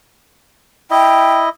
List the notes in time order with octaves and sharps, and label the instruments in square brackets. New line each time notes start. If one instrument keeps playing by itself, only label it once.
[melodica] E4 D#5 [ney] G5